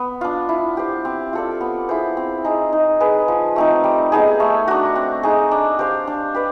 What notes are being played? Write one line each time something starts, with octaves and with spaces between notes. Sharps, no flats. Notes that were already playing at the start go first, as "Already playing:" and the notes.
Already playing: B3
D4 F4
E4
G4 C5
C4
F4 A4 D5
B3
E4 G#4 C5
C4
D#4 G#4
D#4
G#4 B4
F3
A3 C4 D#4
G3
B3 D#4 G#4
A3
D4 F#4
C4
D#4 G#4
D4
G4 C5 F5
D4
G4 B4 D5